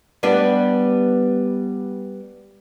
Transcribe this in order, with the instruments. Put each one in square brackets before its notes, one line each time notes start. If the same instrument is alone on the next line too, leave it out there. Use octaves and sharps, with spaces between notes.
[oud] G3 B3 D4